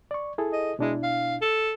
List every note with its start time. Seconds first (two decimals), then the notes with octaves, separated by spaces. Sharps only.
0.11 D5 C#6
0.38 E4 G#4 A4
0.52 D#5
0.79 B2 G#3 D4 E4
1.03 F5
1.41 A4